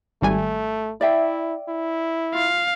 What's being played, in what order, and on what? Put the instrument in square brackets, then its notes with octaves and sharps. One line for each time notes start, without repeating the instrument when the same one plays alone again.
[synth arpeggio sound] G#1 G3 G#5 [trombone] A3
[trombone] E4 [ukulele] D5 E5 G5
[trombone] E4
[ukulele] F4 [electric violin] F5